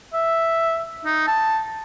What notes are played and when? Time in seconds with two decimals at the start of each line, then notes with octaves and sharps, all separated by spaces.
0.13 E5
1.05 D#4
1.27 A5